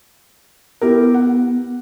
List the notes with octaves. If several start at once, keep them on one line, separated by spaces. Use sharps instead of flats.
B3 E4 G4 A#4
F#5